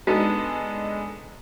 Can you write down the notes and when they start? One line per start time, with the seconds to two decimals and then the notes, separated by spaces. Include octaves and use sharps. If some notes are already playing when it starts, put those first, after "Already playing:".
0.07 G#3 B3 D4 D#4 A4